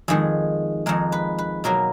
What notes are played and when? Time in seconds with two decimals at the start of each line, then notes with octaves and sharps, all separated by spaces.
0.08 F2 D#3 G#3 G#4
0.86 F2 D#3 G#3 A#4
1.12 B4
1.38 B4
1.64 B2 F#3 A#3 A#4